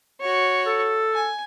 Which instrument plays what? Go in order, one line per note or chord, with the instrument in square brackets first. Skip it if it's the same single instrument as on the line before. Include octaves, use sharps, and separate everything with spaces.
[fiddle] F#4 C#5
[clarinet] A4
[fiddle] G#5